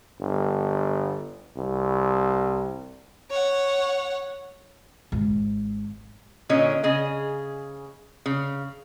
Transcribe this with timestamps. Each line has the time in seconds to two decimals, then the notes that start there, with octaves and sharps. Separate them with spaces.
0.20 G1
1.57 C2
3.30 C#5 F#5
5.12 G#1 C#4
6.49 A#2 D3 C#4 C#5 D#5
6.83 C#3 G#4 D#5
8.26 C#3